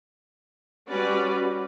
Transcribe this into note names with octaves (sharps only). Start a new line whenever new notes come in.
G3 C#4 F#4 B4 D5